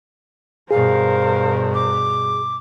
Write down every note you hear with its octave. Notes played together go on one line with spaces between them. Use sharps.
G2 B2 G#4 A#4 C5 F5
D6